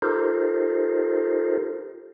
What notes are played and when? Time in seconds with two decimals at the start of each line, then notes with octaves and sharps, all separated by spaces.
0.02 D#4 F4 G4 A4 A#4 C5